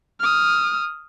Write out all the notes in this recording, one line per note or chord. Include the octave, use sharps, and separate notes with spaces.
D#6 F6